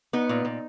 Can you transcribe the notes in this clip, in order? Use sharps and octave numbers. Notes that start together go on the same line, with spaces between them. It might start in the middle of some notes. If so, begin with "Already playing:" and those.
B3 D#4
A#2
A#2